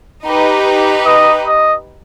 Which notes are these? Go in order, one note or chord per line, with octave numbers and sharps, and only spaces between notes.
D#4 G4 B4
D#5
D#5